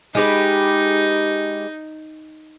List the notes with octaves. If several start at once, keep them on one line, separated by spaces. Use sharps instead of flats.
G#3 D#4 G4 B4